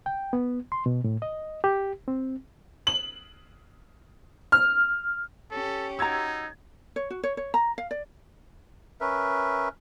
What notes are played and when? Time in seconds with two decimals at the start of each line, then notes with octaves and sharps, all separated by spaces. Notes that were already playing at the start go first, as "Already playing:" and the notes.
0.06 G5
0.33 B3
0.72 C6
0.86 B2
1.04 A2
1.22 D#5
1.64 G4
2.08 C4
2.87 F#7
4.52 F6
5.51 C#4 G4 A4
5.99 D#4 F#4 A#5 E6 G#6 A6
6.96 C#5
7.10 F#4
7.23 C#5
7.37 C#5
7.54 A#5
7.78 F5
7.91 D5
9.00 C#4 A#4 B4 E5